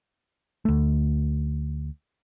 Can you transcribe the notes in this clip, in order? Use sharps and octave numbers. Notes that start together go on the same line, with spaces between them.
D2 A3